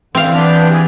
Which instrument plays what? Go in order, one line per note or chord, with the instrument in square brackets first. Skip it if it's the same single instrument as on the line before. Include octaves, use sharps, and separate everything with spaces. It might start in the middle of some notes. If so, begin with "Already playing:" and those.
[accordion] D3 [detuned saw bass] E3 [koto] C4 F5
[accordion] B3 D4 G4
G#4